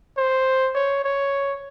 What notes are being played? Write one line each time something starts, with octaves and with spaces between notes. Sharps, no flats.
C5
C#5
C#5